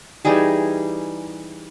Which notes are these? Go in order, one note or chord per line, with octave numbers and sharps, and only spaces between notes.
E3 G3 D#4 G#4